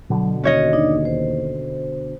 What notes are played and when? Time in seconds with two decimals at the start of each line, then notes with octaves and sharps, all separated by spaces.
0.10 B2 D3 F#3
0.44 D#2 C#4 F#4 C#5 D#5
0.73 D4 D#4 D5
1.05 C5